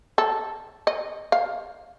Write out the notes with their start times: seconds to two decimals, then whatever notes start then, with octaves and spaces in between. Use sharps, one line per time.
0.18 A4
0.87 D#5
1.32 F5